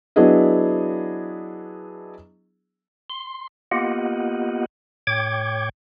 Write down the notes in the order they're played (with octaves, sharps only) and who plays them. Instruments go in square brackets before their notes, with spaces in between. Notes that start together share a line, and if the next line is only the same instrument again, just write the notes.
[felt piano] F#3 B3 D4 E4 G#4 D#5
[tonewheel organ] C6
A#3 B3 F4 G4 D#5 F#5
A2 C#5 G5 D6 G#6